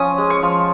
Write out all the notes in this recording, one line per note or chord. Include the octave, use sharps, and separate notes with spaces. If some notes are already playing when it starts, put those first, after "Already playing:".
Already playing: F3 C#4 C#6 D#6
G#3
C#6
F3